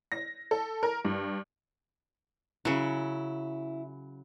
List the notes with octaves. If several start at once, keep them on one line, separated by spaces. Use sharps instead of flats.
A#6
A4
A#4
G2
C#3 F#3 E4